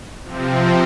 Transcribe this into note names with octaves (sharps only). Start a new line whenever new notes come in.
C3 F3 C4